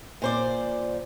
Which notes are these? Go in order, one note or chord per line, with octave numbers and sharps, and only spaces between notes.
A#2 C5 D5